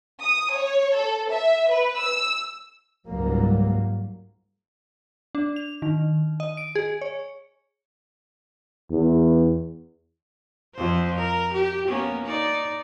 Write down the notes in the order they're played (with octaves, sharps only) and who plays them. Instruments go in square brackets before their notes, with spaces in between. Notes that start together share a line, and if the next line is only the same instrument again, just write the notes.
[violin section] D#6
C#5
A4
E5
B4
E6
[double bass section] C#2 G#2 F#3 G3 A#3
[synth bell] D4
F7
D#3
D#5
D7
G#4
C#5
[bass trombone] E2
[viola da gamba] F2 C5
A#4
G4
A#3 B3 C#4
D#4 D5